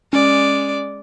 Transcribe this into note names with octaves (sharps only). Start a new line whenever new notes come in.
G#3 C#4 D5